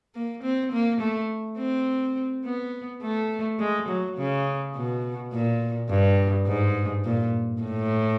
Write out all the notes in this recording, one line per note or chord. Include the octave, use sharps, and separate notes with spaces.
A#3
C4
A#3
A3
C4
B3
A3
G#3
F#3
C#3
B2
A#2
G2
G#2
A#2
A2